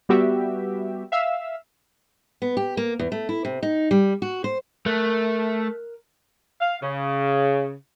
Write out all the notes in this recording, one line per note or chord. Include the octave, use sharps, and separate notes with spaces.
G3 B3 F#4 G4 E5
E5 F5 E6
B3
G4
A#3
E2
A3
E4
C3
D#4
G3
F#4
C5
A3 A#4 F#6
F5
C#3